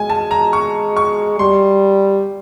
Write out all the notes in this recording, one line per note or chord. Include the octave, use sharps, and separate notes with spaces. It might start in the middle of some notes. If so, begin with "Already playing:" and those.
Already playing: G#3 G#5
A5
A#5
C#6
C#6
G3 C6